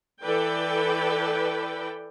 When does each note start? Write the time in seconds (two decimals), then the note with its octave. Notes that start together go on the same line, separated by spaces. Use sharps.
0.23 E3 A4 B4 D5 G5